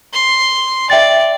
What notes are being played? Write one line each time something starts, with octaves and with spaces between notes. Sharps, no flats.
C6
D5 E5 G5 A6